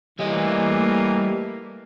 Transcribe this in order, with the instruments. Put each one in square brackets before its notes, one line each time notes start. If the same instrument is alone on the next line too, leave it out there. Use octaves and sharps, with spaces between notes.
[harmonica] E3 [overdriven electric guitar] G3 D#5 [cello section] A3 A#3